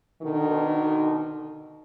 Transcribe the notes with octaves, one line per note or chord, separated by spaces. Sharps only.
B2 D3 D#3